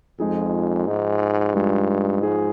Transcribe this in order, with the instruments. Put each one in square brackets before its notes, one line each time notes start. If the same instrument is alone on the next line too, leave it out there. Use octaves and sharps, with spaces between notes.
[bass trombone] F2 [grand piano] F3 G#3 D#4 G#4
[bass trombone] G#2 [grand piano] F3 G#3 D#4 G#4
[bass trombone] G2 [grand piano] F3 G#3 D#4 G#4
[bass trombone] G#2 [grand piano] F3 G#3 D#4 G#4